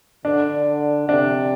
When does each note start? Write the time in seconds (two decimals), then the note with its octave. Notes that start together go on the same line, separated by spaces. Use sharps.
0.25 D3 D4
1.09 C3 D4